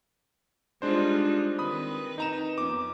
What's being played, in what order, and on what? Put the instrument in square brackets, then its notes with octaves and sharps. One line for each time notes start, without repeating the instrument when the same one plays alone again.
[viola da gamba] G3 D#4 F4 [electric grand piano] G#3 D4 C5
[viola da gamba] D#3 C4 B4 [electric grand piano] B5 D#6
[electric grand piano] D#4 A#5 E7
[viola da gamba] F2 B3 C#4 [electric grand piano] D6